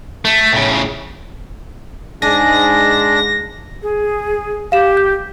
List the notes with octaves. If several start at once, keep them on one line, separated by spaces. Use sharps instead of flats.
A3
A2 C#3
G#2 G#3 D4 G#4 A#6
G#4
G4 F5 E7
G6